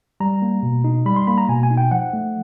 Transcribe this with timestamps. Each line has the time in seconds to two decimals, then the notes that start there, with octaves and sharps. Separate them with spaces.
0.20 G3 A#5
0.42 A#3
0.63 B2
0.84 D#4
1.06 G3 B5
1.16 C6
1.27 A#3 B5
1.38 A#5
1.49 B2 G#5
1.63 G#5
1.71 D#4
1.77 G5
1.91 F3 F#5
2.13 A3